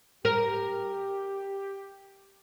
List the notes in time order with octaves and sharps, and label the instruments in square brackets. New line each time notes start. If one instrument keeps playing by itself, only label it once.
[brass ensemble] G4 [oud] A#4